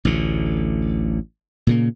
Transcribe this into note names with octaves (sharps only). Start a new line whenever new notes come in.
A1 D2 D3
A#2 C#3 A#3